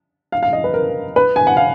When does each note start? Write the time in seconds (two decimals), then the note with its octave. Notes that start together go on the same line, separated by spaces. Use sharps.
0.32 F5
0.43 F5
0.53 D#5
0.64 B4
0.74 A#4
1.16 B4
1.36 G#5
1.47 F#5
1.57 F5